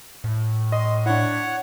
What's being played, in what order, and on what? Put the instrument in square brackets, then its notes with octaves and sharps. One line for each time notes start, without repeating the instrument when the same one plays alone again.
[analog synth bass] A2
[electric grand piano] D#5 [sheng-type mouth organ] C6
[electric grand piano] D4 E4 [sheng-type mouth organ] C#5 F#5